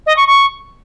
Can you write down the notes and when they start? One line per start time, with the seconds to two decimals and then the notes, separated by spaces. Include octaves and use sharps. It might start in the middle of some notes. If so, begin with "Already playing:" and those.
0.06 D#5
0.17 C#6
0.27 C#6